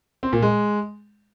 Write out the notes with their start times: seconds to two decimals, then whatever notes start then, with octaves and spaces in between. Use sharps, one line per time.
0.23 C4
0.33 A#2
0.42 G#3